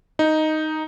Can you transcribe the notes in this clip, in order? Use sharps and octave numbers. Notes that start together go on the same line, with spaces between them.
D#4